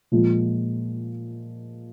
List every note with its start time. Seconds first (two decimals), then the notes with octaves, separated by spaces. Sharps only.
0.12 A#2 F3 G#3